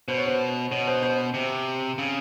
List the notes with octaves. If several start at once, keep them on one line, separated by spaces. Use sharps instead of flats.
B2 C5
C#5
C5
B2 C#5
C5
C5
C3
C#3